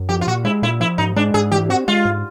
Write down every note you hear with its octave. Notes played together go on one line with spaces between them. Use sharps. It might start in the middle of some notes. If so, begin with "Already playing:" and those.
Already playing: F#2
F3 G4
F4
A#2 F#4
G#3 E4
A#2 E4
F3 E4
G#2 D#4
G#3 D4
G#2 G#4
E3 G4
C4 F#4
G#3 F4
G#2